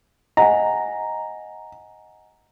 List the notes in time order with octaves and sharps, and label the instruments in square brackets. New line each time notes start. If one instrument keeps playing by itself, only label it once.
[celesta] D#5 F#5 G#5 [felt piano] A#5